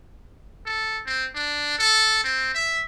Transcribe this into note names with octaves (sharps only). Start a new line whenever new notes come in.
A4
C4
D4
A4
C4
E5